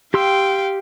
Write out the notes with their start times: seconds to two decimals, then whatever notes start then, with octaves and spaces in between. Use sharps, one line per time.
0.14 G4 F5 G5 C6 E6